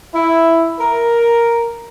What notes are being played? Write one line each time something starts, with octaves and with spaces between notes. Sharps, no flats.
E4
A#4